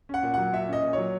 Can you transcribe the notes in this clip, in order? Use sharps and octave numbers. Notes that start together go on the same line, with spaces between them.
C#4 F#5
A#2
F#3 F#5
A#2 E5
C#4 D#5
A#2
F#3 C#5